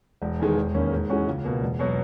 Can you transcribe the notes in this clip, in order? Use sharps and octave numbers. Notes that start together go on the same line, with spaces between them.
E1
E2 D#3 G#3
E1
D#2 D#3 A#3 C#4
G#2
E3 G#3 C#4 F#4
C#2
B2 A#3
E1
B2 F#3